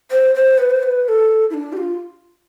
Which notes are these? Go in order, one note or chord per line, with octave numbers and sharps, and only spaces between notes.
C5
C5
B4
C5
B4
B4
A4
E4
D4
G4
F4